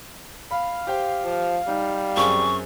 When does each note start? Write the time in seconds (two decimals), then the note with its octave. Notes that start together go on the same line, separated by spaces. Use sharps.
0.51 F5 B5
0.87 G4 C5 G5
1.24 F3
1.68 G3 D#4
2.17 F#2 C4 G#4 C#6